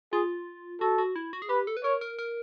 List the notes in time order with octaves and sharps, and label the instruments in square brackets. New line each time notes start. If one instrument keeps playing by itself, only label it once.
[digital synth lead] F4 [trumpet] G#4
[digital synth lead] F#4 [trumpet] A4
[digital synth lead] F#4
E4
F#4
G#4
[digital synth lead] G4 [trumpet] B4
[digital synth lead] A4
B4
[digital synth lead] A#4 [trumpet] C#5
[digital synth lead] A#4
A#4